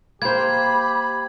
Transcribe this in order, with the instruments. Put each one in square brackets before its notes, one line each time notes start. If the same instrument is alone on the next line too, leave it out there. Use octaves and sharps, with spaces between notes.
[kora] A#3 C5 [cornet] G4 [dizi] B5 [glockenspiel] G#6